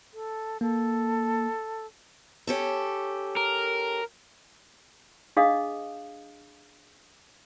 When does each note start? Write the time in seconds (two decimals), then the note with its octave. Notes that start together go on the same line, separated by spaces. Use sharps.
0.13 A4
0.61 A#3 A4
2.47 C#4 G4 A4
3.37 A#4
5.37 D4 G#4 D#5 F5 D#6